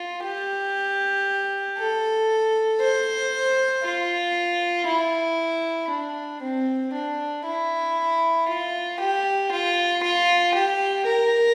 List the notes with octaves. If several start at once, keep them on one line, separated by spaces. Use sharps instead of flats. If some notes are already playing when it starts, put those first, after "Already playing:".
Already playing: F4
G4
A4
C5
F4
E4
D4
C4
D4
E4
F4
G4
F4
F4
G4
A#4